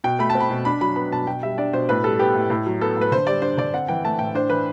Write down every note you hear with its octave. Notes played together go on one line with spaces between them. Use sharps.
B2 G5
A3 B5
A5
C4
B5
B2
D4 B5
F#3 B5
B3 B5
B2 A5
B2 G5
G3 E5
D4 D5
B2 C5
A2 B4
G3 A4
B3 G4
A2
A2
F#3
B3 A4
A2
B4
D3 C5
G3 D5
D4 C5
D3 D5
C4 F#5
E3 G5
A3 A5
A2 G5
D4 C5
E3 B4